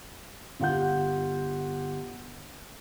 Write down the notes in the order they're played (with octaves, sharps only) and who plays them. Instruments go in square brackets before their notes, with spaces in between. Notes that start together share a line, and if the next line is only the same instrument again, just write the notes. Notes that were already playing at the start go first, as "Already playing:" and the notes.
[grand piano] G1 F4 G4 F#5 G6